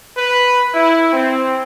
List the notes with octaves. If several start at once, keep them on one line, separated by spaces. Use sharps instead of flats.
B4
E4
C4